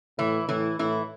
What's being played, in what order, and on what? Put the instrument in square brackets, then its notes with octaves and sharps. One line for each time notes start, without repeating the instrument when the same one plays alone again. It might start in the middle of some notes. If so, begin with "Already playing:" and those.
[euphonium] A2 [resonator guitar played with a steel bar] E3 E4
[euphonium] A2 [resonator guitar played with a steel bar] E3 E4
[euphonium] A2 [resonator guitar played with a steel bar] E3 E4